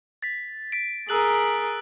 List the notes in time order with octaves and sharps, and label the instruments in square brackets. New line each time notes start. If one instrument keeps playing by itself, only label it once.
[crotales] A6 B6
B6 D7
[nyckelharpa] G#4 A#4 [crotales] E6 F#6 F#7